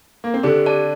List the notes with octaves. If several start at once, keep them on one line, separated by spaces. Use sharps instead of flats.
A#3
C4
D3 D4 G4
D5 A5